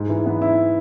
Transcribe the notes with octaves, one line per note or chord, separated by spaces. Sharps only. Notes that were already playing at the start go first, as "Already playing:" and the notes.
Already playing: G#2
E3
B3
E4